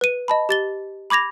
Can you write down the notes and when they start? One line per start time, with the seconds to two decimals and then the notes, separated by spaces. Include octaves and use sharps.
0.01 B4 D#7
0.28 D#5 A5 B5
0.49 G4 A6 G7
1.10 B5 D6 G#6 A#6 F7